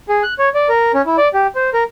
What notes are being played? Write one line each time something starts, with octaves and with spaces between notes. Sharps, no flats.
G#4
F#6
C#5
D5
A#4
C#4
E4
D5
G4
C5
A#4